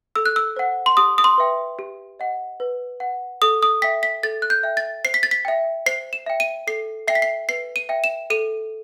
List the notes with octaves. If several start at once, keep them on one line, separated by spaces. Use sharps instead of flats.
A4 E6
F#6
E6
C5 F#5
C6
G4 D#6
D#6
C6
B4 E5 G5
G4
D#5 F#5
B4
F#5
A4 D#6
D#6
E5 G5 B6
B6
A4 A6
F#6
G6
E5 G5
A6
C5 C7
B6
A6
B6
E5 G5
C5 C7
E7
E5 G5
D#7
A4 C7
E5 G5 C7
B6
C7
B4 C7
D#7
E5 G5
E7
A4 D#7